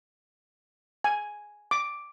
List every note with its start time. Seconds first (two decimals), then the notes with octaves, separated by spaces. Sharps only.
1.04 G#5
1.71 D6